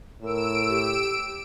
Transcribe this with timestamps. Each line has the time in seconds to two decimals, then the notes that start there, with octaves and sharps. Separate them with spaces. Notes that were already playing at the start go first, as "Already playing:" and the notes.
0.22 A2 A#4 E6 D7
0.69 G4